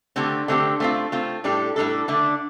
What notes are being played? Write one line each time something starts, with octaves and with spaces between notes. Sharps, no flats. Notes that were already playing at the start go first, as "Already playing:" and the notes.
D3 A3 C4 G4
D3 A3 C4 G4
A3 C4 F4
A3 C4 F4
A2 G3 D4 A4
A2 G3 D4 A4
D3 A3 D4